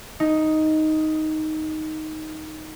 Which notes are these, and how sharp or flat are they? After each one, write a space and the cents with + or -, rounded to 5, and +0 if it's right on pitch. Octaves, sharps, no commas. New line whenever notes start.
D#4 +5